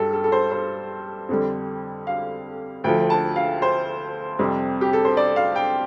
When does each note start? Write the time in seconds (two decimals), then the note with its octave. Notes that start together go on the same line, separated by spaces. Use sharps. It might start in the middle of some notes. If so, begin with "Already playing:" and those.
Already playing: G2 G3 A4
0.13 A4
0.24 A4
0.32 C5
0.52 C5
1.29 F2 D3 G3
2.07 F5
2.84 D2 D3 F3 G5
3.10 A5
3.36 F5
3.62 C5
4.39 F2 C3 G3
4.81 G4
4.93 A4
5.05 C5
5.17 D5
5.36 F5
5.56 G5